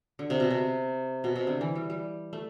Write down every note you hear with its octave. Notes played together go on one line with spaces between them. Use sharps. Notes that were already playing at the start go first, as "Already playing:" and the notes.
D3
C3
B2
C3
B2
C3
D3
E3
G3
G3
A3